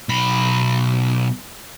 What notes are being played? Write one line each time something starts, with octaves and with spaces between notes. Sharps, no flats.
B1 B5